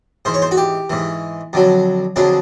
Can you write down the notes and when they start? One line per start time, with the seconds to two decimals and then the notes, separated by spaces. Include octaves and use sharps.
0.25 G#2 E3 C5
0.34 C#5
0.42 C5
0.51 F#4
0.57 G4
0.90 G#2 E3
1.53 F2 D3 F#3
2.16 F2 D3 F#3 G#4